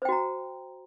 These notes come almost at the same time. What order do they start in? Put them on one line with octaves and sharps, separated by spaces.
C5 G5 F#4 A#5